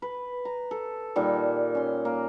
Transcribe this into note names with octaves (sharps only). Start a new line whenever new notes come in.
B4
A#5
A4
A#2 D#3 G3
C#4 C6
A#3